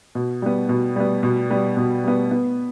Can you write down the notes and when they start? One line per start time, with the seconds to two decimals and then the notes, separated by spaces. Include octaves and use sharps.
0.15 B2
0.42 G3 B3
0.69 B2
0.96 G3 B3
1.23 B2
1.50 G3 B3
1.77 B2
2.04 G3 B3
2.31 B3